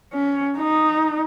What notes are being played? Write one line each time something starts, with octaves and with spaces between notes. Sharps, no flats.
C#4
D#4